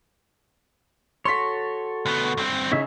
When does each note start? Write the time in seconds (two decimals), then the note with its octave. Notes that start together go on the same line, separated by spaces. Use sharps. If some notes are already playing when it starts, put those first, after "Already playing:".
1.25 F#4 A4 C#5 C6 B6
2.06 D2 B3
2.37 G2 C4
2.72 C#3 D#4 C#5 E5 E6